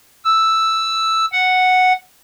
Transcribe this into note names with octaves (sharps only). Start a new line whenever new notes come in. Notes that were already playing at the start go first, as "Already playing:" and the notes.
E6
F#5